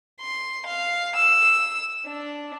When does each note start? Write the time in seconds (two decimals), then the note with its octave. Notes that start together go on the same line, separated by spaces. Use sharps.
0.21 C6
0.66 F5
1.18 E6
2.08 D4